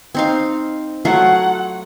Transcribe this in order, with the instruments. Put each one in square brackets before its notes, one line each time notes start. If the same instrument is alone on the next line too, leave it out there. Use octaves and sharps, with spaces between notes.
[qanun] C4 D#4 F5
[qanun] F#3 A3 F4 [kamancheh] F#5